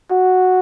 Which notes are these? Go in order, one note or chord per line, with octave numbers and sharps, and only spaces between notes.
F#4